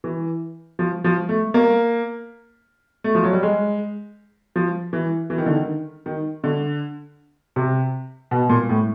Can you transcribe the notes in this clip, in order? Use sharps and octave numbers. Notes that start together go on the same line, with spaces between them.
E3
F3
F3
A3
A#3
A3
F3
F#3
G3
G#3
F3
E3
E3
D#3
D3
D#3
D#3
D3
C3
B2
A#2
A2